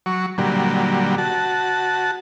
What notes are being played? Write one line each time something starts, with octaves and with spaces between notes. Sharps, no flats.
F#3 C#6
A#2 D3 F#3 G3
F#4 A5